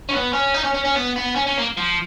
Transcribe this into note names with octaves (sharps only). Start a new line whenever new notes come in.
C#4
B3
C#4
D#4
C#4
C#4
C#4
B3
B3
C#4
C#4
A#3
F3